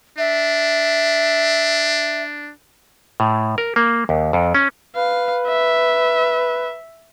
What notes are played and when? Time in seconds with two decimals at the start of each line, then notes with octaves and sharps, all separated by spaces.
0.18 D4 E5
3.20 A2
3.58 A#4
3.76 A#3
4.09 D#2
4.33 F2
4.54 C#4
4.96 B4 F5
5.47 E5